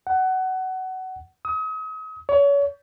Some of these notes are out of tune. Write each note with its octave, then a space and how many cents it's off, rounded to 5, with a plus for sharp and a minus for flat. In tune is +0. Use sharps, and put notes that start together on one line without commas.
F#5 +20
D#6 +40
C#5 +35